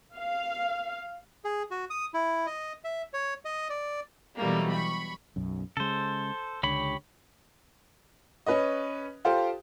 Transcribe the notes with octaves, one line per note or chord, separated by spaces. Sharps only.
F5
G#4
F#4
D#6
E4
D#5
E5
C#5
D#5
D5
B2 E3 F#3 G3 A3 A#3
B5 C#6
B1 F#2
C#3 G#3 A4 C5
C#2 D3 G4 C#5 B5
C#4 B4 C#5 D#5
F4 G4 A4 C5 F5 G5